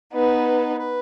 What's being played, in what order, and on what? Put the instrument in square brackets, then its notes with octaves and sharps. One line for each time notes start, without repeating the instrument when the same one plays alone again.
[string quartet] B3 D#4 [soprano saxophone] B4
[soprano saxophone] B4